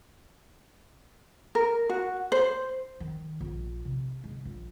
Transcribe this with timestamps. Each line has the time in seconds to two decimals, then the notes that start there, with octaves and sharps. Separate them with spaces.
1.55 A#4
1.89 F#4
2.32 C5
3.00 D#3
3.41 A#1
3.85 C3
4.24 G#3
4.45 A#1